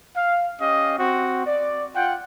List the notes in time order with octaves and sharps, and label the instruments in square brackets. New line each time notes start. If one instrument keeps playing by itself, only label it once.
[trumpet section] F5
C#4 G4 D#5 F5
C4 F#4
D5
F4 F#5 G5